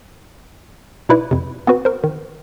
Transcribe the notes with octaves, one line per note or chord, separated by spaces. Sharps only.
B2 D#4 E4 B4 D5
F2 C3
B3 C4 F#4 B4
A#4 C5
D#3